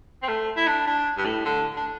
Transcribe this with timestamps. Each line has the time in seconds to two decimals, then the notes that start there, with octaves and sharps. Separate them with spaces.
0.23 C4
0.28 A3
0.57 E4
0.67 D4
0.87 D4
1.18 G2
1.25 A2
1.45 D3
1.77 D4